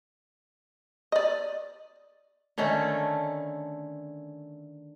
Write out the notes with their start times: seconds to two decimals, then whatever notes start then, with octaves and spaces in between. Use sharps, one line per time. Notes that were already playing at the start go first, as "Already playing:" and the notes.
1.12 D5 D#5
2.58 D3 D#3 A3 C#4